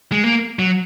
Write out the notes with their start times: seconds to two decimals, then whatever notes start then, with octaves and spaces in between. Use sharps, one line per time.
0.12 G#3
0.24 A#3
0.59 F#3